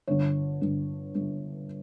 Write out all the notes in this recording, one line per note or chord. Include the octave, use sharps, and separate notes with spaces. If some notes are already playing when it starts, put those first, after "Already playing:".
G1 G2 D3 C#5
G1 G2 D3
G1 G2 D3